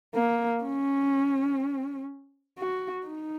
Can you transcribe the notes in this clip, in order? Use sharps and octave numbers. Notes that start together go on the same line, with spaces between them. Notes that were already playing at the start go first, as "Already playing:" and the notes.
A#3
C#4
F#4
D#4